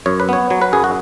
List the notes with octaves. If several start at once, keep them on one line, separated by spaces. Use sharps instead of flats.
F#2 C#5
B4
B3 C#5
F#3 C#5
B4
F#2 G#4
F#4